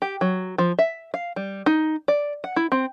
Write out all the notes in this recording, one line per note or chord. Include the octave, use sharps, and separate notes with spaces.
G4
F#3
F3
E5
F5
G3
D#4
D5
F#5
E4
C4